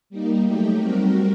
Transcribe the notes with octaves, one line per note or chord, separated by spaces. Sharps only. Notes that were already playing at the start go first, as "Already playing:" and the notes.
G3 A#3 D#4
F#3 A3 D#4 G4
G3 C4 F#4 A#4